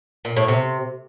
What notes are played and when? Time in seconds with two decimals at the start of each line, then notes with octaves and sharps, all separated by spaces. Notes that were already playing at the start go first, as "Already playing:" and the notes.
0.25 A#2
0.37 A2
0.48 C3